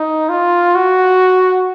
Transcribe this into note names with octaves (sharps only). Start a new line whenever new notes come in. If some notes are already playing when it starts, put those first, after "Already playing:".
Already playing: D#4
F4
F#4